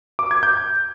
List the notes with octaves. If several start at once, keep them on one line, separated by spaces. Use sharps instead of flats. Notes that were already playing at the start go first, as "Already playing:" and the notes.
D6
G#6
G6